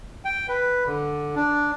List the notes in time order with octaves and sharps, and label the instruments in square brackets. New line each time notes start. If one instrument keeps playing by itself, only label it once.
[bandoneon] G5
B4
D3
D4